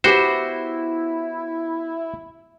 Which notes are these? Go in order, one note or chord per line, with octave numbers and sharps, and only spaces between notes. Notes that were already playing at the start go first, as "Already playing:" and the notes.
B3 E4 F#4 G4 B4 C5